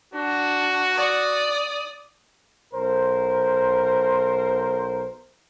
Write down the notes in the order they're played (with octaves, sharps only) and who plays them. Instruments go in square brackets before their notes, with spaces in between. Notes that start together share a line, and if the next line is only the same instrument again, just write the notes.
[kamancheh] D4 [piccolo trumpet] F#4
[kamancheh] D5 D#6
[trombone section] B1 A#4 C5